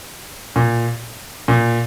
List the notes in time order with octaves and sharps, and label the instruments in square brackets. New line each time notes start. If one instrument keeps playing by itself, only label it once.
[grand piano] A#2
A#2